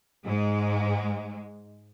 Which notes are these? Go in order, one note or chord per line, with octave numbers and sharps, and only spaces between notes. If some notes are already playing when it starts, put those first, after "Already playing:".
G#2 G#3